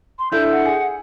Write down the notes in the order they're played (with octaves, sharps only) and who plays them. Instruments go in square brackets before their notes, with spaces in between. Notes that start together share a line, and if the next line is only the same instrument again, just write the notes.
[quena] C6
[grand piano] D4 E4 A4 [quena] G6
[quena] F#5
[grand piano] G#4